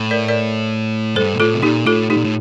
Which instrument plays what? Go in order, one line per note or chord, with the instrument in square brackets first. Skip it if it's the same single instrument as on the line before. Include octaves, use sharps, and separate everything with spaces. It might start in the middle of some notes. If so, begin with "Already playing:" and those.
Already playing: [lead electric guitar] A2
[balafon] A#4 D5
A#4 D5
[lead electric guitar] G2 [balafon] A4 C5
[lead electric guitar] A#2
[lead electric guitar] A2 [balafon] F4 A4
[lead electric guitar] C3
[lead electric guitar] A#2 [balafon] D#4 G4
[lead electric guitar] A2 [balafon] F4 A4
[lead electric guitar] A2 [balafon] D#4 G4
[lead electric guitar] A#2
A2